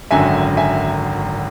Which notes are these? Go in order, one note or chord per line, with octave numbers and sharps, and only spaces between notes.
G#1 F#2 D3 F#3 E5 G#5
E5 G#5